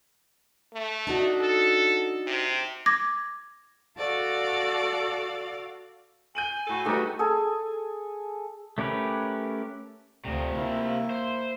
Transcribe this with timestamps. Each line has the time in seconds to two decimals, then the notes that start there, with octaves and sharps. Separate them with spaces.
0.74 A3
1.07 D4 D#4 F#4
1.41 A4
2.27 C3
2.86 D6 G#6 A#6
3.98 F#4 A4 D5 F5
6.35 G#5 G6 D#7 F#7
6.52 G#5
6.67 A2 F#4 A4 D#7
6.85 G3 A3 D#4 F#4 G4 A4 B4
7.19 G#4 A4 G#5
8.78 A3 C#4 G4 A#4 B4
10.25 D2 C3 F3
10.56 A#3 E4
11.10 C5